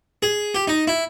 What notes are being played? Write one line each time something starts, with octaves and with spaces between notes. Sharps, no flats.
G#4
G4
D#4
E4